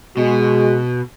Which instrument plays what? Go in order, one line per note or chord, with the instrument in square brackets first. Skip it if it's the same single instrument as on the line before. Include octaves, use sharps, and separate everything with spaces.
[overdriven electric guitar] B2 [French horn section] G#3 F#4